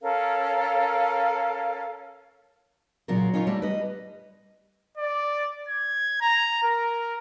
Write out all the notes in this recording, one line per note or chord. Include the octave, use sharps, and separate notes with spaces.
C#4 A4 A#4 F5
A#2 C#3 F#3 F4 F#4 A#4
C#4 D#4 F4 A#4 C5 C#5
G3 A3 A#3 F#4
B4 D#5
D5
G#6
A#5
A#4